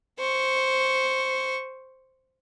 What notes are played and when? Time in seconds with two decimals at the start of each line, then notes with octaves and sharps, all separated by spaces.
0.19 C5 C#6